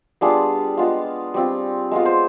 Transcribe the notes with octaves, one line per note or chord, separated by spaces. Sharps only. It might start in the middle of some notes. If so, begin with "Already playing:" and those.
G3 B3 D4 F4 G#4
G#3 B3 F4
G3 C4 F4
G#3 B3 F4
C5